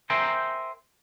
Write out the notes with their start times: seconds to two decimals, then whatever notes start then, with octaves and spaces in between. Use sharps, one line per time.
0.10 A#4 C5 E5 G5 G#5 A#5